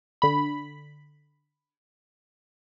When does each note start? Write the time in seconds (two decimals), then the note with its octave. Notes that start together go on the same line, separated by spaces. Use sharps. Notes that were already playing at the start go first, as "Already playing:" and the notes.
0.22 D3 B5